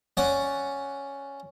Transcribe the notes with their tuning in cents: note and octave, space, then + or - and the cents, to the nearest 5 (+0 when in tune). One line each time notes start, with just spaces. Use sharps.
C#4 +0 D5 +0 F#5 +0